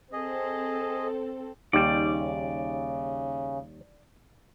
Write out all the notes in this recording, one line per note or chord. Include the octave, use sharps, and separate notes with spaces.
C4 G#4 A4 D#5
D#2 C#3 G3 D#4 G#4 D5 G5